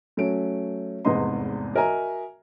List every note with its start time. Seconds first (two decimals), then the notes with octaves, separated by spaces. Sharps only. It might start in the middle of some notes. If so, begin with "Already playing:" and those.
0.17 F#3 A3 C#4 D7
1.05 F1 E2 G#2 B4 D#5 C6
1.75 F#4 A#4 D#5 E5 G#5 A#5